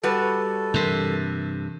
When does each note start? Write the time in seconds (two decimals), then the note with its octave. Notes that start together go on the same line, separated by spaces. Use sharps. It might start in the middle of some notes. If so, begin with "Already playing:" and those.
0.03 G3 F#4 A4 B4
0.74 G2 C3 E3 A#4 C6